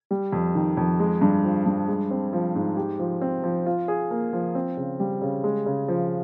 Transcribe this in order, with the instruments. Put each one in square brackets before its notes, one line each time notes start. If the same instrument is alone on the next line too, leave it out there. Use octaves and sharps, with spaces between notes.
[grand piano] G3
F2
D#3
F2
G#3
G2
F3
G2
G#3
C4
F3
G#2
G4
F3
C4
F3
F4
G#4
A#3
F3
C4
C#3
G3
C#3
G#3
C#3
F3